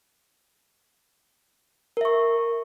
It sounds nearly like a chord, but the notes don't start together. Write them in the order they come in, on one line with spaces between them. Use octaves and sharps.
A#4 E5 C#6